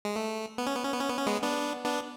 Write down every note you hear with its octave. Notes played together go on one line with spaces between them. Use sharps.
G#3
A3
B3
C#4
B3
C#4
B3
C#4
B3
C#4
G#3 B3
B3 D4
B3 D4